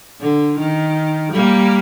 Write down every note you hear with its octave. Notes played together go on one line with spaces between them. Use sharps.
D3
D#3
G3 A#3